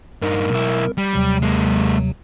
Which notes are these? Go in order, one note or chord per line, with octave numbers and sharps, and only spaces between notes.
G2 D#4 A#4
B1 E4
G3
D#2 C3 F#3
G#3 A#3